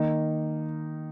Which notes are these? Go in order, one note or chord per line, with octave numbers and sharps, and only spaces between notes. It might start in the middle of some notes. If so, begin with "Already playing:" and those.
Already playing: D#3 A#3 D#4